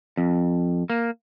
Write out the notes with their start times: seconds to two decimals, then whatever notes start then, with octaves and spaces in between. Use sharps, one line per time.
0.17 F2
0.90 A#3